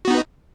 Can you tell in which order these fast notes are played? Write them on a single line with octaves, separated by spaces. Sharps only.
F#4 B3 D#4